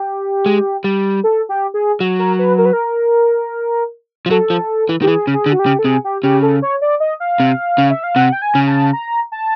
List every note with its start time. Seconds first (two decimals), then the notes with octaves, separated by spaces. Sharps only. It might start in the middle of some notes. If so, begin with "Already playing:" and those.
Already playing: G4
0.46 G#3
0.84 G3
1.24 A4
1.49 G4
1.74 G#4
2.00 F#3
2.19 A#4
2.39 B4
2.58 A#4
2.65 B4
2.73 A#4
4.26 F3
4.30 F#3 A4
4.50 F3
4.89 E3
5.02 D#3 G4
5.07 E3 G#4
5.27 C#3
5.34 G#4
5.46 D3
5.53 F#4
5.59 G4
5.66 C#3
5.79 A4
5.84 C3 G#4
6.04 G4
6.23 C#3 G4
6.43 A4
6.62 C#5
6.82 D5
7.00 D#5
7.20 F5
7.40 C3
7.78 C#3
7.90 E5
8.03 F5
8.16 C3 F#5
8.32 G5
8.42 G#5
8.55 C#3
8.67 A5
8.93 A#5
9.32 A5